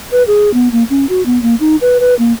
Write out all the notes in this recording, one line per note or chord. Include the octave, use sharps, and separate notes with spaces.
B4
G#4
B3
A#3
C#4
F#4
B3
A#3
D#4
B4
B4
A#3